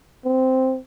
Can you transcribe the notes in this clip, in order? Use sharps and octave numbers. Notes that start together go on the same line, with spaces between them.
C4